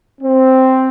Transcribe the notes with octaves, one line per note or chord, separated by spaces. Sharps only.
C4